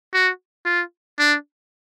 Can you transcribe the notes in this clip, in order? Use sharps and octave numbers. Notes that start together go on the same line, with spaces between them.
F#4
F4
D4